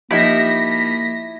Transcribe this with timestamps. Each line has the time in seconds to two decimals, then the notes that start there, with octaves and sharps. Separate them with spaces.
0.11 F3 A#3 D#4 E4 G4 A#6 B6